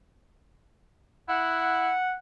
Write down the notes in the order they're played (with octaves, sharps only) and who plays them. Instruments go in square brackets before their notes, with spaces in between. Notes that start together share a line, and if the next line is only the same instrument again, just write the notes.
[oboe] E4 [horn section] F#5